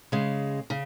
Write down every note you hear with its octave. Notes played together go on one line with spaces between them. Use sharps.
C#3 G#3
C#3